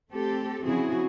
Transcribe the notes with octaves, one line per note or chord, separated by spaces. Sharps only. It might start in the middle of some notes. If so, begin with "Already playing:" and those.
A3 C4 G4 A4
C#3 F3 C4 E4 F#4 G#4